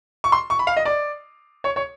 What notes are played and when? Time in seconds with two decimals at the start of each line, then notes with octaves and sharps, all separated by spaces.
0.24 C#6
0.32 C6
0.50 C#6
0.59 B5
0.67 F5
0.77 D#5
0.85 D5
1.64 C#5
1.76 C#5